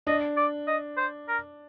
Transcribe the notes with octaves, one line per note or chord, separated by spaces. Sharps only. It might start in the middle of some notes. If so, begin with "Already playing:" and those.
D4 D#5
D5
D#5
C5
A#4